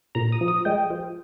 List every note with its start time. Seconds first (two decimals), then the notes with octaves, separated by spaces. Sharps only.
0.15 A#2 A#5
0.32 D#6
0.41 F3
0.48 D#6
0.65 G#3 G5
0.90 F3